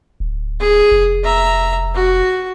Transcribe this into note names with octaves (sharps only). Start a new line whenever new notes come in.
D1
G#4
F1
E5 A#5
F#4